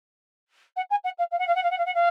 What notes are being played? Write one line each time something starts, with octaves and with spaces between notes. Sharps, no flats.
F#5
G#5
F#5
F5
F5
F#5
F5
F#5
F5
F#5
F5
F#5
F5